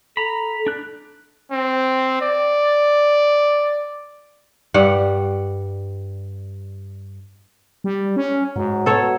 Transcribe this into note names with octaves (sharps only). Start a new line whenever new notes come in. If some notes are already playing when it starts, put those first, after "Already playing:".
A4 A#5 B5
D4 F#6
C4
D5
G2 G3 F#5
G3
C#4
G#2 F#3
B2 A4 C#5